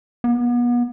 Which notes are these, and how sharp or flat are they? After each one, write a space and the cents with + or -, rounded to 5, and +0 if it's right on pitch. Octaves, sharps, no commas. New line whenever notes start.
B3 -35